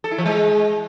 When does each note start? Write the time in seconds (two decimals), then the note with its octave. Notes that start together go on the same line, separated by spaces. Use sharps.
0.04 A4
0.11 E4
0.18 F3
0.26 G#3